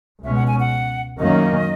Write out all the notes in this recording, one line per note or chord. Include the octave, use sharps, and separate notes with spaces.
C#2 B2 G#3 C#4 E5
F#5
G#5
F#5
F#2 D#3 A#3 C#4 D#5